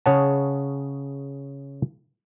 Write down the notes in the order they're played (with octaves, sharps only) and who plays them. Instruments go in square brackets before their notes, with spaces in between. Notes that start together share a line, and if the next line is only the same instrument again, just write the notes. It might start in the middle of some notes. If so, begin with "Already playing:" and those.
[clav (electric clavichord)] C#3 G#4 C#5 F#5 A5